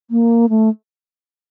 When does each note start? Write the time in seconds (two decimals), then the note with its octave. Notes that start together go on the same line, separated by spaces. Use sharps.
0.11 A#3
0.49 A3